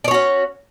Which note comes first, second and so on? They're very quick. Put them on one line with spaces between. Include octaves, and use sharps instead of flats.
D5 C#5 F#4 C#4